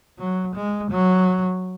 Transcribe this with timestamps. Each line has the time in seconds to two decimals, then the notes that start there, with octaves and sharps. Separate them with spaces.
0.19 F#3
0.56 G#3
0.91 F#3